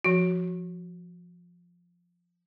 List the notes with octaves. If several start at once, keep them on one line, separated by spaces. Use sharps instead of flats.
F3 F#4